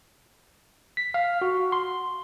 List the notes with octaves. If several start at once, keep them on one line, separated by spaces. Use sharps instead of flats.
B6
F5
F#4
C6